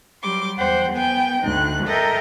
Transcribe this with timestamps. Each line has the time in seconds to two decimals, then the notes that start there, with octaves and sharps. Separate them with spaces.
0.23 F#3 G3 C6 D6
0.59 E2 C5 F#5 G5
0.93 B3 G5 G#5
1.43 D2 D#4 F#6
1.86 A4 A#4 D#5 E5 G5 A#5